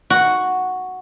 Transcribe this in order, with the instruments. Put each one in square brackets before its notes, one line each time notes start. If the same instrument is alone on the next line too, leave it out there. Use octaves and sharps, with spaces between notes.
[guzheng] F#4